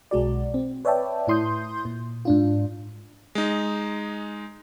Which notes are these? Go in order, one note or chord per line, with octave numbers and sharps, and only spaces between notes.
B1 G#3 F#4 D5
C4
B4 C#5 D5 E5 G5 A5
A2 E4 C6 D#6 G6
A#2
G#2 D4 F4
G#3 D#4